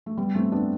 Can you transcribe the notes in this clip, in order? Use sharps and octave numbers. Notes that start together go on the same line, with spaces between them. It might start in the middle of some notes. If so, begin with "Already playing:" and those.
A3
G3 B3
A3 C4
B3 D4